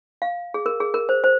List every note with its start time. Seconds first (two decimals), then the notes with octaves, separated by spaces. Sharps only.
0.22 F5
0.54 G#4
0.66 A#4
0.80 G#4
0.94 A#4
1.09 C5
1.24 C5